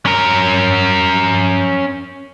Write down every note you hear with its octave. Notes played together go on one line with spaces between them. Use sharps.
C#4 A#4